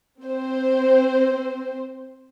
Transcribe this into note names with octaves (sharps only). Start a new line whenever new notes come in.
C4 C5